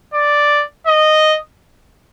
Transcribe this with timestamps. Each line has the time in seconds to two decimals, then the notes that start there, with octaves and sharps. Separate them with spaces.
0.14 D5
0.87 D#5